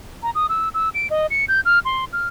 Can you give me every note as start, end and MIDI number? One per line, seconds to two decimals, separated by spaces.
0.23 0.31 82
0.35 0.47 87
0.49 0.69 88
0.74 0.89 88
0.94 1.10 98
1.10 1.27 75
1.30 1.45 97
1.48 1.61 91
1.65 1.79 89
1.85 2.05 84
2.13 2.28 89